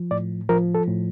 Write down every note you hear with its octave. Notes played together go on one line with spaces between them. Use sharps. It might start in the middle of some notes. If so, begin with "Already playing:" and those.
Already playing: F3
A2 D5
F3 A#4
A4
A2